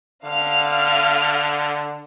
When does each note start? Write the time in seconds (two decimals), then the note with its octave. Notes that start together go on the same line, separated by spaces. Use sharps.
0.24 D3 F5 F6